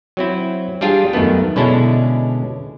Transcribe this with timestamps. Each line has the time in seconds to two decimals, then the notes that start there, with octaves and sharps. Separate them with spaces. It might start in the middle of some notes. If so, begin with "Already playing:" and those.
0.17 F#3 C4 E4
0.81 G3 D4 F4 G4 G#4
1.13 F#2 D#3 A3 B3
1.56 B2 D3 G#3 C#4 D4 E4